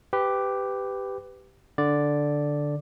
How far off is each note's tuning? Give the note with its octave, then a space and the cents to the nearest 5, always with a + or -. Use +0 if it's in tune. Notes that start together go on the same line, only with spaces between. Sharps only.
G4 +0 B4 +20
D3 +0 D5 +0